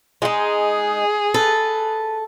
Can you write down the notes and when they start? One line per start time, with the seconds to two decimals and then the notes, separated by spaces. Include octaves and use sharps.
0.22 G#3 D#4 G#4
1.34 A4 B4